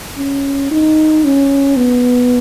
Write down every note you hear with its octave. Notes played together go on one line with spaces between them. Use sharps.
C#4
D#4
C#4
B3